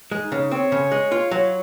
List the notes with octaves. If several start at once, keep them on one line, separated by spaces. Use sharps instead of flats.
G#3
D#4
C#3
C4 C#5
C#3
G#3
F4
F#3